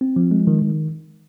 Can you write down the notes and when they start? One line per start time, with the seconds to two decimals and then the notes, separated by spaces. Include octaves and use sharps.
0.01 C4
0.16 F3
0.31 G#3
0.47 D#3
0.62 D#3